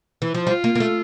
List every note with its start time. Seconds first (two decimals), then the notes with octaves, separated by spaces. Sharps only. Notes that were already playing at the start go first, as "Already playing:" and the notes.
0.22 E3
0.34 F3
0.47 G3 F4
0.64 A#3
0.75 A#3
0.80 A3